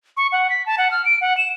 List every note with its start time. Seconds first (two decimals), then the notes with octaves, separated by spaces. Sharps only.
0.17 C#6
0.32 F#5
0.50 B6
0.66 A5
0.78 F#5
0.91 F6
1.05 D7
1.21 F#5
1.37 E7